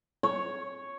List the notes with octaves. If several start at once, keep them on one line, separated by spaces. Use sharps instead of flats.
C#5